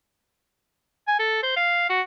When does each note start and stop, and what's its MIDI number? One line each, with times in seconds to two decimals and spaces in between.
1.08 1.16 80
1.20 1.43 69
1.43 1.56 72
1.57 1.85 77
1.90 2.01 66